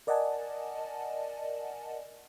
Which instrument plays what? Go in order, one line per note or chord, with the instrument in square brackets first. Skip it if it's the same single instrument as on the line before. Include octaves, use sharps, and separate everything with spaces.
[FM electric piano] A#4 D5 D#5 F#5 G#5 A5